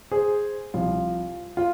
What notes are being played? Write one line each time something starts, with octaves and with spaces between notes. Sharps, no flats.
G#4 C5
C2 C3 F3 F4
F4